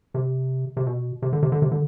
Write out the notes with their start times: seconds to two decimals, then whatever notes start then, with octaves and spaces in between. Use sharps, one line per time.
0.14 C3
0.77 C3
0.87 B2
1.22 C3
1.33 D3
1.43 C3
1.52 D3
1.62 C3
1.72 D3